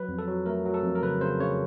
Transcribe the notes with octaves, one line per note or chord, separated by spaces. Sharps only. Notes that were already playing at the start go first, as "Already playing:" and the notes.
Already playing: F#3 B4
F2
A4
F#3
A3 A#4
F#3
A4
F2
A#4
C#3 B4
C#3 C5
C#3 C#5